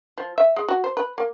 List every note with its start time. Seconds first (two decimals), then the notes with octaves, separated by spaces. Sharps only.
0.18 F3
0.38 E5
0.56 G#3
0.68 F#4
0.84 C5
0.97 B4
1.18 A#3